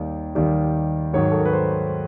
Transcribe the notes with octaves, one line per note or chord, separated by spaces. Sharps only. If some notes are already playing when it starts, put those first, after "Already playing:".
Already playing: D#2 D#3 G3
D#2 D#3 G3
G#2 D#3 F#3 C#5
A4
A#4
B4
C5